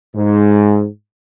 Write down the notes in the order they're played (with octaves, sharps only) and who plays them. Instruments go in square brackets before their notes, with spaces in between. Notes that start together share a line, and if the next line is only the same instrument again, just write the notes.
[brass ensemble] G#2